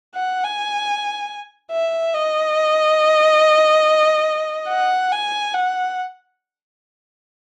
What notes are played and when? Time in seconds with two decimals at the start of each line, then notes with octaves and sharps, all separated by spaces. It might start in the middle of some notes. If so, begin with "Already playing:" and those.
0.15 F#5
0.44 G#5
1.71 E5
2.14 D#5
4.69 F#5
5.11 G#5
5.54 F#5